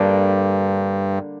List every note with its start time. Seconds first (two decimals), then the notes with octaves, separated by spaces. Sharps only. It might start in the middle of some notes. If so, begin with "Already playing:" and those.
Already playing: G2 D3 G3 A#3 D4